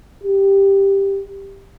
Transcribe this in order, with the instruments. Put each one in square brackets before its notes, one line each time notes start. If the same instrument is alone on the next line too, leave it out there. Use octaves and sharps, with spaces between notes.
[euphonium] G4